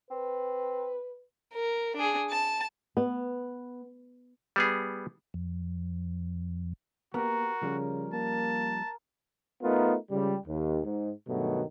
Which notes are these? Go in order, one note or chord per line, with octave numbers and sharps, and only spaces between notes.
C4 B4
A#4
D4 G#4
A5
B3
G3 B3 G#4
F2
A#3 B3 F#4 G4 A#4
C#3 F3 G3 C#4
A#3 A5
A3 B3 D#4 F4 A#4
C#2 G3
D#2
G#2
G2 B2 D#3 F#3 A3